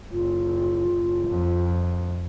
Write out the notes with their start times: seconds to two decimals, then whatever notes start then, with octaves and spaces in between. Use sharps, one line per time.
0.12 F#1 F4
1.28 F2